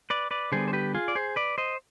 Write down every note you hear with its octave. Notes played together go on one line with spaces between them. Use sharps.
B4 D5
B4 D5
D3 G3 B3 G#4 C5
C5
G4 B4
F4 G#4
D5
G#4 C5
B4 D5
C5 D#5